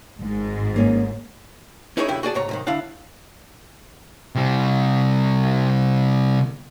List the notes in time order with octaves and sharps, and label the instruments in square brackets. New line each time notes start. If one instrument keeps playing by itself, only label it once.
[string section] G#1 G#2
[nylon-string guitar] A#3 C#4
[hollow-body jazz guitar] C#4 D#4 E4 G#4 B4 C#5
B1 D3 E4 G4
F#4 G#4 D5 A5
C#2 G#2 C#5 A#5
C2 G#2 D#3
D3 D4 E4 F5 F#5
[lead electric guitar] C3 G3